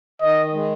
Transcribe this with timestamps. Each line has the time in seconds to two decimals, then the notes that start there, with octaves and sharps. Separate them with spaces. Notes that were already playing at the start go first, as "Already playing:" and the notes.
0.21 D#3 D#5
0.54 G#3